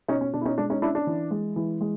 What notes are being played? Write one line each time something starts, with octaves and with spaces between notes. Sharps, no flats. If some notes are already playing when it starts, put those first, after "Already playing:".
B2 C#4 D#4
C#4
B2 D4
E4
C#4 D#4
G#3 D4
C#4 D#4
C#4 D4 E4
D4
E3
G#3
E3
G#3